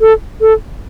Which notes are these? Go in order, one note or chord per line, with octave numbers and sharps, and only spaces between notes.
A4
A4